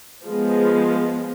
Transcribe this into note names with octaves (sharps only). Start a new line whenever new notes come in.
F3 G#3 B3